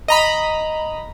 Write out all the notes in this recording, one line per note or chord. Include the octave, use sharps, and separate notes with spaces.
D#5 A#5 B5